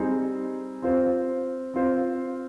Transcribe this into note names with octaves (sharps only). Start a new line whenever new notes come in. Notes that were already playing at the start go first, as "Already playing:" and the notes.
Already playing: G3 C4 D#4 G#4 C5
C4 F4 C5
C4 F4 C5